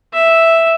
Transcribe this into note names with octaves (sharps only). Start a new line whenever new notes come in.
E5